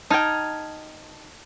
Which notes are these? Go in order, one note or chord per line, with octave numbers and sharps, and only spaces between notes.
D#4 G5 A5 F6 G#6